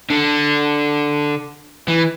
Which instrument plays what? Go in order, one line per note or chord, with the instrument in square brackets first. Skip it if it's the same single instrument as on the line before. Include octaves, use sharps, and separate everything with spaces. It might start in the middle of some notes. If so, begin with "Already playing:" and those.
[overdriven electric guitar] D3
E3